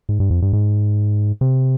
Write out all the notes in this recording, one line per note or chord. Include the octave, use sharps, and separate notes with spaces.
G#2
G2
F2
G2
G#2
C3